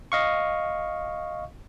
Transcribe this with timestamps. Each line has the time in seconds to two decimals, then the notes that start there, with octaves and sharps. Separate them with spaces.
0.12 D#5 F5 C#6